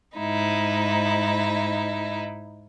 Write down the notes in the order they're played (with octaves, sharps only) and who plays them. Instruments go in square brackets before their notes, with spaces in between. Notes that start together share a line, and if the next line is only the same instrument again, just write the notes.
[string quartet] G#2 D#4 E4